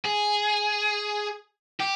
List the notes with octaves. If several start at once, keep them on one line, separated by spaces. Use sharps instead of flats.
G#4
G4